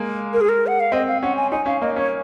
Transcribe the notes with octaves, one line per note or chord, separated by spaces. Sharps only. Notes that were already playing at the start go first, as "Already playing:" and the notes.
Already playing: G#3 A#3
A#4
G#4
A#4
F#5
F5
C4 D#5
F5
C#4 F#5
G#5
D#4 G#5
C#4 F5
A#3 D#5
C#4 C#5